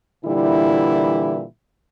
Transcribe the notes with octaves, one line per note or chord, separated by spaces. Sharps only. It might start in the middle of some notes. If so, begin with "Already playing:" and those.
A#2 D3 E3 G3 E4